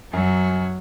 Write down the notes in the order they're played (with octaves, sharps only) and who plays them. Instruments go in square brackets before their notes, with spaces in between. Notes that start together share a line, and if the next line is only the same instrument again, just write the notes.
[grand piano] F#2 [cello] F#3